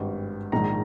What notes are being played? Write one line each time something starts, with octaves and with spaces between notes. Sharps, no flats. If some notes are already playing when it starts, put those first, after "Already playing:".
Already playing: G#1 G2 G3
A#1 G#2 D#3 A#5